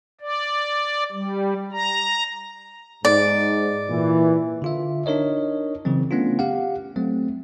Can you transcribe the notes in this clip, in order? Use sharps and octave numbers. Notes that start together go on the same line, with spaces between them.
D5
G3
A#5
G#2 D5
A#2 E3
D3 F4 E5
D4 D#4 A#4 C#5 D#5
C#3 E3 F#3 C4
A3 B3 C#4 D4 F4
G4 F5 F#5
F#3 A3 C4